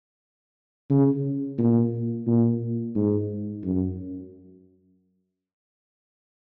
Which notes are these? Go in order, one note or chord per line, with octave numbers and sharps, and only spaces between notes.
C#3
A#2
A#2
G#2
F#2